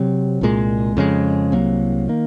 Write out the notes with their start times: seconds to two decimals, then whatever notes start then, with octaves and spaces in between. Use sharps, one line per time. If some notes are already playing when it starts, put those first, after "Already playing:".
Already playing: C3 F#3 C4
0.41 C2 A#2 G#3
0.97 F2 C#3 G#3
1.52 C2 C3 F#3 A#3
2.08 D#3 A#3